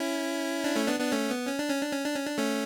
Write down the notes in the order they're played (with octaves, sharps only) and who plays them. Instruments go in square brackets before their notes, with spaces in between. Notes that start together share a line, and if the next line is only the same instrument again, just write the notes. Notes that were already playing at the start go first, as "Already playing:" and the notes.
Already playing: [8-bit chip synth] C#4 E4
D4
A3 C#4
B3 D4
B3 D4
A3 C#4
B3
C#4
D4
C#4
D4
C#4
D4
C#4
D4
A3 C#4